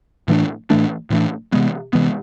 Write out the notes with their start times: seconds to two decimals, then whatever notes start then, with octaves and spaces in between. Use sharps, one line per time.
0.28 A2 E3 A3 D4
0.70 A2 E3 A3 D4
1.10 A2 E3 A3 D4
1.52 C3 E3 G#3 B3
1.93 C3 E3 G#3 B3